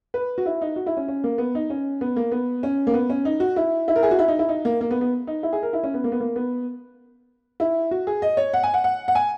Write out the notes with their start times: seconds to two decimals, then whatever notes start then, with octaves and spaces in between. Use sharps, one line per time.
0.14 B4
0.38 F#4
0.46 E4
0.61 D#4
0.76 F#4
0.86 E4
0.97 C#4
1.08 C#4
1.24 A#3
1.38 B3
1.55 D#4
1.70 C#4
2.01 B3
2.16 A#3
2.32 B3
2.63 C#4
2.87 A#3
2.94 B3
3.10 C#4
3.25 D#4
3.40 F#4
3.56 E4
3.88 E4
3.96 A#4
4.03 G#4
4.11 F#4
4.19 E4
4.28 D#4
4.39 E4
4.49 D#4
4.65 A#3
4.81 A#3
4.91 B3
5.01 B3
5.27 D#4
5.43 E4
5.53 G#4
5.63 A#4
5.73 E4
5.83 C#4
5.94 B3
6.04 A#3
6.12 B3
6.20 A#3
6.36 B3
7.60 E4
7.91 F#4
8.07 G#4
8.22 D#5
8.37 C#5
8.54 F#5
8.63 G#5
8.74 F#5
8.84 F#5
9.08 F#5
9.15 G#5